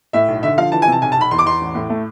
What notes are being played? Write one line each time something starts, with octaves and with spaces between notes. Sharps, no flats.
A2 E5
B1
D3 E5
F3 F5
E3 A5
G#5
C3 A5
B1 G#5
A5
B1 B5
E2 C6
D6
E2 C6
A1
A2
A3